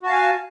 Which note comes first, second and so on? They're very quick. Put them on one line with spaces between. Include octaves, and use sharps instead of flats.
F#4 A5 F5 G#5